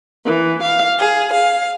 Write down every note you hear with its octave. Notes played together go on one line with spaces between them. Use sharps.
E3
F5
G#4
F5